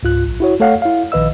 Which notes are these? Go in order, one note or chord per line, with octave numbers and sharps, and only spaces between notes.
C#2 G#2 F4 F#6
A#1
E4 F#4 C#5
A3 A4 C#5 F5 F#5
E4 F5
A#1 D#3 B4 D#5 E6